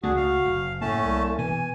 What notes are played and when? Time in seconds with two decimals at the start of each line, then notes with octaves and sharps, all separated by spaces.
0.03 C#2 A3 D4 F#4 G#4
0.17 F5
0.45 F#1
0.81 A2 A3 A#3 C#4 A5
1.02 C2
1.38 B2 E3 G#5